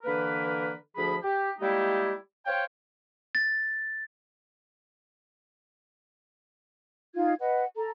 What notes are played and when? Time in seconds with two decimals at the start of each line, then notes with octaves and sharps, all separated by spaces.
0.03 D3 E3 A#3 A#4 B4
0.95 D2 F3 G#4 B5
1.22 G4
1.59 G3 G#3 A#3 D#4 E4 G4
2.45 C5 C#5 F5 G5
3.35 A6
7.15 D#4 F4 F5 G#6
7.40 B4 D#5 F#5
7.76 A4 A#5